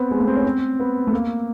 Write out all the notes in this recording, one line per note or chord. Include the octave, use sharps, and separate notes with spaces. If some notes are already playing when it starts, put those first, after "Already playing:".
Already playing: B3 C4
G#3
A3
C4
C#4
C4
B3
A3
A#3